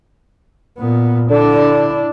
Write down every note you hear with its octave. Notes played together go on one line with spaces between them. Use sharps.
A#2 B3
D3 D4 E4